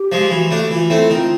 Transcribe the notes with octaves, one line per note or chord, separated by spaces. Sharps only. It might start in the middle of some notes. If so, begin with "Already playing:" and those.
Already playing: G4
F3 G#3
E3 F#4 G4
A3 D4
E3 F4 F#4
A3 C4 E4
D#3 F4